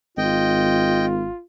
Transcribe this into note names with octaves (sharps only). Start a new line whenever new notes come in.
G#1 F4 D#5 G5